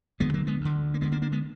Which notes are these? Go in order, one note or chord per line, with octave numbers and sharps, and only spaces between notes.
D2 D3 G#3 B3
F#3 A#3
G#3 B3
D2 D3
A#3
D2 D3 G#3 B3
A#3 D4
A#3 D4
G#3 B3